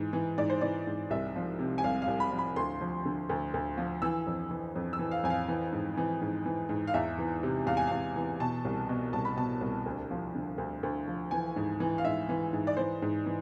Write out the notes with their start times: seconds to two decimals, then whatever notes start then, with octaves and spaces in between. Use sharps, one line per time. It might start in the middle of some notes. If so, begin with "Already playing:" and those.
Already playing: G#2 E3
0.13 E3
0.38 G#2 D5
0.50 C5
0.61 E3 D5
0.87 G#2
1.10 C2 E5
1.36 F3
1.59 C3
1.78 G#5
1.84 C2 F5
2.02 F5
2.08 C2
2.20 B5
2.32 F3
2.38 B5
2.56 D2 C6
2.81 F3
3.05 D3
3.29 D2
3.54 D2
3.77 F3
4.02 E3 E6
4.27 F2
4.51 E3
4.76 F2
4.93 E6
4.99 E3
5.11 F5
5.24 F2 G#5
5.30 F5
5.48 E3
5.73 G#2
5.97 E3
6.22 G#2
6.46 E3
6.69 G#2
6.87 F5
6.94 E2 E5
7.18 E3
7.43 C3
7.66 E2 F5
7.77 G#5
7.87 E2 F5
8.16 E3
8.40 B2 A5
8.65 C2
8.89 B2
9.13 C2 A5
9.25 B5
9.37 B2 A5
9.61 C2
9.86 D2
10.11 F3
10.35 D3
10.58 D2
10.83 D2
11.08 F3
11.31 E3 G#5
11.56 G#2
11.80 E3
11.98 F5
12.05 G#2 E5
12.29 E3
12.53 G#2
12.67 D5
12.77 E3 C5
13.02 G#2
13.26 E3